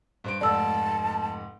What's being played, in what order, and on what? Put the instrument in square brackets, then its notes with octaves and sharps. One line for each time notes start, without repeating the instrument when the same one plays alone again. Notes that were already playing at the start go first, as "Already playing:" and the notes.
[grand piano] G2 C5 D7
[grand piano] F1 G#2 A3 [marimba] D5 E6 [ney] A5